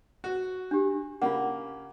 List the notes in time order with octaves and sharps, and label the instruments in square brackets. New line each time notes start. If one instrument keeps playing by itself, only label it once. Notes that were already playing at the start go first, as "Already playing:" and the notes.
[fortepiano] F#4
[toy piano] D4 G4
[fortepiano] C#3 A#3 [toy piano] F4 F#5